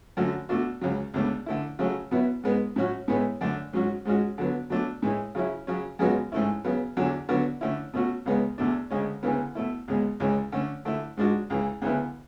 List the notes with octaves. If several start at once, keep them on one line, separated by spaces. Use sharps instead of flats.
F#2 D3 A3 C#4 F#4
B2 A3 D4 F#4
C#2 C#3 F#3
C#2 B2 A3 D4
D3 A3 E4
C#3 F#3 A3 C#4 F#4
B2 F#3 B3 E4
G#2 G#3 B3
A2 F#3 C#4 F#4
A2 E3 G#3 B3
F#2 D3 A3 D4
G#2 F#3 C#4 F#4
G#2 G#3 C#4 F#4
D3 F#3 B3
B2 F#3 A3 D4
A2 E3 G#3
C#3 F#3 C#4 E4
C#3 F#3 C#4
F#2 C#3 G#3 B3 F#4
G#2 E3 A3 C#4 E4
C#3 F#3 B3
E2 D3 F#3
D3 F#3 B3 D4 F#4
D3 A3 C#4 E4
B2 A3 C#4 F#4
C#2 C#3 G#3 B3
E2 B2 A3 D4
D2 C#3 G#3 C#4
D2 C#3 E3 B3
B2 A3 E4
C#2 B2 G#3
C#2 C#3 E3 G#3
D3 A3 C#4
D3 A3 E4
G#2 G#3 D4 F#4
C#2 C#3 E3
D2 C#3 E3 B3 E4